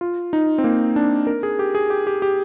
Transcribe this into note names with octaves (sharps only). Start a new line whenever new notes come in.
F4
D#4
C4
A#3
D4
A#4
G#4
G4
G#4
G4
G4
G4